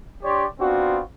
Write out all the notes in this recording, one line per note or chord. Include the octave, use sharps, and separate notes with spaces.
D4 G4 C#5 D5 C6
B3 C4 D4 F4 F#4